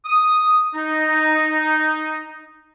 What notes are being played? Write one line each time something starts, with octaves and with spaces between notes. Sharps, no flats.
D#6
D#4